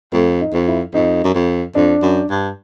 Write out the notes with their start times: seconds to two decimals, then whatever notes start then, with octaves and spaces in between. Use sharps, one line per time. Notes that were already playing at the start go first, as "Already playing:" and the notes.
0.13 F2 A3
0.41 D#4
0.53 F2
0.68 E4
0.94 F2 D#4
1.24 F#2
1.34 F2
1.75 F2 D4
2.02 F#2
2.30 G2